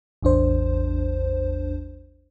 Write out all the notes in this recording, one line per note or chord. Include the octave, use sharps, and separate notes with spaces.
A1 E2 D4 C5